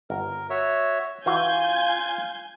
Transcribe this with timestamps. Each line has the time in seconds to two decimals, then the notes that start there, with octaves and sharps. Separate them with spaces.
0.10 G1 A#4
0.50 F#4 C#5 E5
1.26 E3 F4 F#4 F5 G#5 G6 G#6